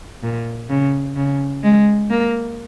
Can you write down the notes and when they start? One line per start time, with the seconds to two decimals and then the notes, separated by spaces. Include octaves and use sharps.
0.23 A#2
0.69 C#3
1.16 C#3
1.63 G#3
2.10 A#3